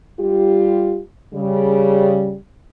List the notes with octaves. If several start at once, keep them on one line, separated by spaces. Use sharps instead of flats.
G3 F4 G4
C#3 G3